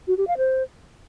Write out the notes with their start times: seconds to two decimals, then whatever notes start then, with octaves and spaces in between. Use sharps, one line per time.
0.07 F#4
0.17 G4
0.27 F5
0.37 C5